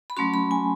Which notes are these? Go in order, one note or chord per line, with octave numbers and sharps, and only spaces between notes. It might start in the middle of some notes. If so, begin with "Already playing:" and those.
B5
F#3 A3 C#4 F#4 C6
B5
G#5